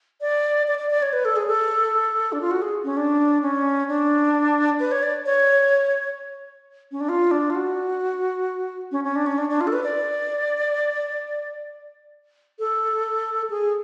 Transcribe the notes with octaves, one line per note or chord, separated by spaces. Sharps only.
D5
D5
D5
D5
C#5
B4
A4
G#4
A4
D4
F4
F#4
G#4
C#4
D4
C#4
D4
B4
C#5
D5
C#5
C#4
D4
F4
D4
F4
F#4
C#4
C#4
D4
C#4
D4
D4
F4
A4
B4
D5
A4
G#4